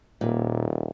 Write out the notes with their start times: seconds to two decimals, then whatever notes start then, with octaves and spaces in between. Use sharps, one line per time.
0.21 D#1 A#2